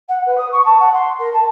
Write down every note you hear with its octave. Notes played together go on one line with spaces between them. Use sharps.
F#5
B4
D#6
C#6
A5
F#5
C6
A#4
A5